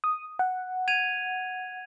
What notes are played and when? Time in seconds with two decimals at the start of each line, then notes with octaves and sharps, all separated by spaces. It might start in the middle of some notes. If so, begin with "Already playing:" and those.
0.04 D#6
0.39 F#5
0.88 G#6 D#7 F7